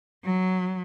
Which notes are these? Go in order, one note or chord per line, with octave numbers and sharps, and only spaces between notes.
F#3